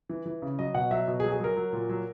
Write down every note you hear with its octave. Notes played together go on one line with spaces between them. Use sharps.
E3
E3
C#3
F#3 D#5
B2 F#5
F#3 E5
B2
G#4
F#3
G#4
F#3 A#4
F#3
A#2
F#3